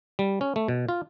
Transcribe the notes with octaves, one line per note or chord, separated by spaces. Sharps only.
G3
C#4
A3
B2
F4